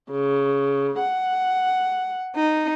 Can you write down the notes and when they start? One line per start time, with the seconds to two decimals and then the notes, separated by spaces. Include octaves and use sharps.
0.11 C#3
1.00 F#5
2.36 D#4